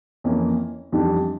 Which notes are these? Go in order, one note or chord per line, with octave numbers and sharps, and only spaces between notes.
F2 E3 A#3 C#4
F2 E3 G3 D4